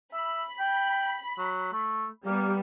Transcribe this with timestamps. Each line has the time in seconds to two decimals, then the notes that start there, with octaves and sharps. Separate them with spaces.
0.13 E5 B5
0.59 G5
1.38 F#3
1.72 A3
2.26 G3 A#3 B3